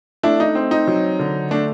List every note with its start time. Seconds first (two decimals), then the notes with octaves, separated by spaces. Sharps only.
0.23 A3 D4 E4
0.40 D#4
0.55 C4
0.71 D#4
0.87 F#3
1.19 D3
1.51 A3 D4